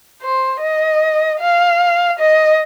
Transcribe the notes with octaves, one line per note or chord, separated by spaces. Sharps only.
C5
D#5
F5
D#5